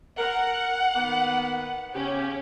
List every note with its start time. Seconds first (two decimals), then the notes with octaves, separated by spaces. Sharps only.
0.18 A#4 F#5
0.96 D#3 A#3 B3
1.95 C#3 C#4 G4